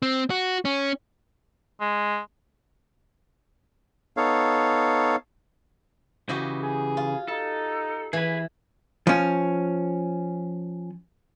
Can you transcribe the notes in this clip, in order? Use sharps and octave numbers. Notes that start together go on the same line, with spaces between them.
C4
F#4
C#4
G#3
B3 D#4 A4 C#5 F5
C#3 E3 F#4 G4 D#5
G#4
F4
D#4 A4
E3 G#4 B4
F3 C#4